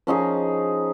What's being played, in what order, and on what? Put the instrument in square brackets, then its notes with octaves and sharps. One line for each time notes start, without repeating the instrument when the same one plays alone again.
[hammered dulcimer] F3 C#4 D#4 G#4